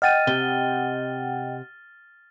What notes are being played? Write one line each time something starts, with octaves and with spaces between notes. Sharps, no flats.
D#5 F#5 G5 F6 A6 D#7
C3 G7